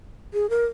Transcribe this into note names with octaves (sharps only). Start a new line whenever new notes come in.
G#4
A#4